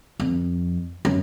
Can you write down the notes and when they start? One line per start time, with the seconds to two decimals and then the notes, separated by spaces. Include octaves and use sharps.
0.20 F2
1.05 F#2